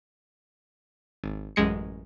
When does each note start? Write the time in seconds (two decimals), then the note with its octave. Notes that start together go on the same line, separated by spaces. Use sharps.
1.24 G#1
1.56 A1 F#2 G#3 C#7